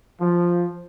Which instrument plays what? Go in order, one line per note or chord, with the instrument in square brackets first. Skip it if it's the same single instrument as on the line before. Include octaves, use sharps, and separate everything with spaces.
[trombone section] F3